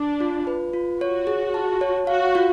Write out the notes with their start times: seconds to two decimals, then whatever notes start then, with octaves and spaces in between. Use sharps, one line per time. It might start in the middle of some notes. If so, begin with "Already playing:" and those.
Already playing: D4
0.20 F4
0.47 B4
0.73 F4
1.01 F#4 C#5
1.27 G#4
1.54 A5
1.81 C#5
2.07 F#4 F5
2.35 F4